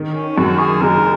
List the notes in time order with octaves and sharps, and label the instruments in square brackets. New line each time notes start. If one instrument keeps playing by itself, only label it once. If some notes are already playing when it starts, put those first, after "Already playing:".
Already playing: [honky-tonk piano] D#3
[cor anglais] C#4
[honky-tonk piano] F#2 [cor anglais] F#4
[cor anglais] G#4
[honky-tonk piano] F#1 [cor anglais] A#4